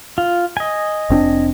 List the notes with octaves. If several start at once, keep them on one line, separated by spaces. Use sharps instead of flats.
F4
D#5 G#5
F1 C4 D4